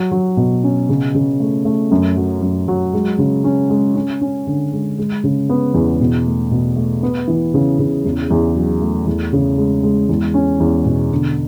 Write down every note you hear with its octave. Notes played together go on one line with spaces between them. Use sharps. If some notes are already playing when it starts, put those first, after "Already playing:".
Already playing: F#3
F#3
B2
C#4
C#3
C#3
A3
A3
F#2
F#3
F#2
F#3
G#3
C#3
C#4
G#3
C#4
C#4
D3
G#3
G#3
C#3
B3
E2
B2
A3
B2
A3
B3
E3
C#3
C#3
E2
E2
F#3
A3
E2
C#3
G#3
G#3
E2
C#4
E2
B2
D3